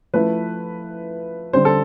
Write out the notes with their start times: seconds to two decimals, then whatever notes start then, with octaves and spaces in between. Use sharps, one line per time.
0.13 F3 A3 E4 B4
1.53 D3 G3 C4 C5
1.65 A4